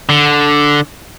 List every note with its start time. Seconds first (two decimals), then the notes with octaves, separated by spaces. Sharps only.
0.09 D3